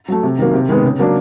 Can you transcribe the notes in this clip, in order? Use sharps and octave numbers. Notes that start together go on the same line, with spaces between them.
F#3 A3
C3
D#3 F#3 A#3
C3
D#3 G#3 B3
C#3
F#3 A#3 D4